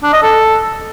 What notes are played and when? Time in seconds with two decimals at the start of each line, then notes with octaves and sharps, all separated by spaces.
0.03 D4
0.13 D#5
0.22 A4